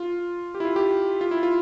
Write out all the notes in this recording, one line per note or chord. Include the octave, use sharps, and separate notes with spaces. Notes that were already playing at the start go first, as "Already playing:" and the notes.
Already playing: F4
G4
E4
F4
G4
F4
E4
F4